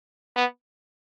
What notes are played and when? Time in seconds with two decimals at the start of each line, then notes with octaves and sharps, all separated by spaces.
0.36 B3